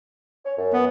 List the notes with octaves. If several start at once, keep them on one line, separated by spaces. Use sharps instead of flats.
C#5
F#2
B3